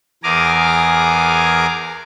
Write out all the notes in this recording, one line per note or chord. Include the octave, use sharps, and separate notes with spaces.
E2 G#4 A#4 G#5 A#5 D6